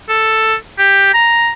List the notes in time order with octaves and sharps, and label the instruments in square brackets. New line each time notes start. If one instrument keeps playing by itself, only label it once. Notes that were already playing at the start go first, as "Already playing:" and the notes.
[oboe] A4
G4
A#5